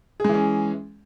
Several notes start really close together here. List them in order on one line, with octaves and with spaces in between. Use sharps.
G#4 G#3 E3 C#4